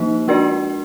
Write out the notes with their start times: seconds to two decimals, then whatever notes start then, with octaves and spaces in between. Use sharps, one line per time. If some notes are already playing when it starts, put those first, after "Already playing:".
Already playing: F3 A#3 D#4
0.28 G#3 D4 F#4 A#4 D5